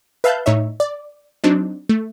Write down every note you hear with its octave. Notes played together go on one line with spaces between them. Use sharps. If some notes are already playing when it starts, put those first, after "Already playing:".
B4 E5 F5 A5 F#6 G6
A2 D#4 C#5 E5
D5
F#3 C4 D4 D#4
A3